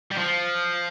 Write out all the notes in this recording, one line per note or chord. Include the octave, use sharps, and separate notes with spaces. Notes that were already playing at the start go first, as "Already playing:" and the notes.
G3
F3